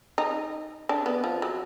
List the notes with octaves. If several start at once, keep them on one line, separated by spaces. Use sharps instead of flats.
D#4
D4
B3
F3
F#3